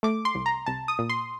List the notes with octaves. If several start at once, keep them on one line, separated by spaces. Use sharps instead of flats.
A3 D6
C6
C2
A#5
C2 A5
D#6
A#2
C6